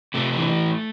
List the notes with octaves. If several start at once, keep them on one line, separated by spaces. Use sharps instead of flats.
C3 A3
E3